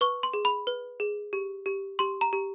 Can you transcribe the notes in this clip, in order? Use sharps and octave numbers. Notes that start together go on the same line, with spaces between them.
B4 C#6
C6
G#4
B5
B4
G#4
G4
G4
G4 C6
A#5
G4